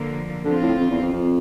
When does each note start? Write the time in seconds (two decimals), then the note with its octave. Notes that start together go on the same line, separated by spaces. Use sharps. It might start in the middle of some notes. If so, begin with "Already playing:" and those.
Already playing: D3 F3 A#3
0.44 D3 F3 C4 F4
0.62 A2
0.79 F2
0.90 E2
1.02 F2
1.13 F2